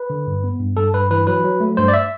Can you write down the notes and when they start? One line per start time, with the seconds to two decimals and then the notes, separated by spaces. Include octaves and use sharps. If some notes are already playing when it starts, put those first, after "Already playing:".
Already playing: B4
0.10 D3
0.27 G2
0.44 B3
0.60 G2
0.77 G2 A4
0.93 G2 B4
1.11 E3 B4
1.27 F#3 B4
1.44 F#3
1.60 A3
1.77 G2 C5
1.88 D5
1.93 E5